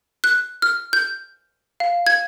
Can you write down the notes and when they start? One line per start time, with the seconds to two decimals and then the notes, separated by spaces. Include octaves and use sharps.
0.24 F#6
0.62 F6
0.93 G6
1.80 F5
2.07 G#6